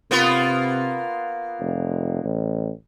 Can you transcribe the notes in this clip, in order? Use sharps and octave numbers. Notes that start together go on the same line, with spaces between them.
C3 A#3 B3 F4
F1
A1